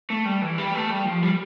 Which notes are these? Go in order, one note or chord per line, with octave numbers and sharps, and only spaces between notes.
A3
G3
E3
G3
A3
G3
F3
G3